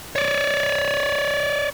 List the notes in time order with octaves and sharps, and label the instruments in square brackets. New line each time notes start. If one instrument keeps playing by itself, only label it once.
[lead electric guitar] C#5 D5